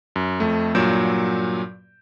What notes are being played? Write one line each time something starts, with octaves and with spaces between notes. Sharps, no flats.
F#2
F2 A3
G2 A#2 F#3 G6 D7 E7